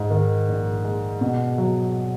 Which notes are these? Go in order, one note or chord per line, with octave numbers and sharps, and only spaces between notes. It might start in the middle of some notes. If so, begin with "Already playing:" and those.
Already playing: G#2
D#3
A#1
G#3
B2
F#3